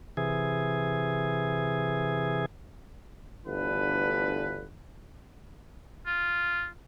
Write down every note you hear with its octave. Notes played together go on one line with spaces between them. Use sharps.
C3 E3 G#4
G1 D2 D3 E3 B4
F4